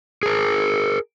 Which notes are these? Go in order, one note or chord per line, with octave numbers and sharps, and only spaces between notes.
G#4 A#4